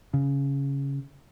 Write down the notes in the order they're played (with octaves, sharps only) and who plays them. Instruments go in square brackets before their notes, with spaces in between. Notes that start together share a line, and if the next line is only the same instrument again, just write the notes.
[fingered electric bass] C#3